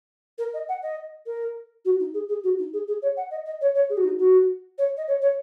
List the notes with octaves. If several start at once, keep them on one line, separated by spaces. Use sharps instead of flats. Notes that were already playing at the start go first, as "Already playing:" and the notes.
A#4
D#5
F#5
D#5
A#4
F#4
D#4
G#4
G#4
F#4
D#4
G#4
G#4
C#5
F#5
D#5
D#5
C#5
C#5
G#4
F#4
D#4
F#4
C#5
D#5
C#5
C#5